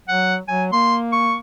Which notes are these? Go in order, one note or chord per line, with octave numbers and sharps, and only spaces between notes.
F#3 F#5
F#3 G#5
A#3 C6
C#6